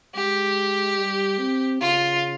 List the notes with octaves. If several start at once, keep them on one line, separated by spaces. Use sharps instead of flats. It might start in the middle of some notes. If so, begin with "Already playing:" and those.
G#3 G4
G3
C4
C#3 F4